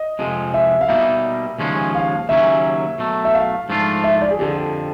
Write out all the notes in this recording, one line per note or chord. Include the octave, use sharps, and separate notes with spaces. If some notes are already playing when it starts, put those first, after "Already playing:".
Already playing: D#5
F2 C3 F3 G#3
E5
F5
B2 G3 A#3 D#4 E5
D#2 C#3 F3 G#3 C#4
F5
D#2 C#3 F#3 A#3 C#4 E5
B2 F#3 A3
E5
F5
G#2 F3 A3 D4 F4
E5
D5
G#4
F2 D3 F3 G4